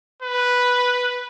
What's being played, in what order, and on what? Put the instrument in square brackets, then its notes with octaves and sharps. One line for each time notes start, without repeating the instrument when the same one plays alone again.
[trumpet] B4